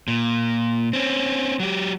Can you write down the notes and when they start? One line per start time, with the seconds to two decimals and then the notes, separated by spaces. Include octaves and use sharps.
0.08 A#2
0.93 C4 C#4
1.60 F#3 G4